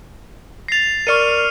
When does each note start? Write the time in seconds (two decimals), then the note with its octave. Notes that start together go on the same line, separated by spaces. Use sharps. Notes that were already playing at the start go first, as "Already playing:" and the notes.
0.68 A6 A#6 C7 F7
1.07 A#4 D5 C#6 F6 C#7 D#7